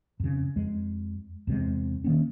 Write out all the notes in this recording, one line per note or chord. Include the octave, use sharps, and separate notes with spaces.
F2 C#3
F2 G#3
E2 C3 G3 G#3
D#3 A#3 C#4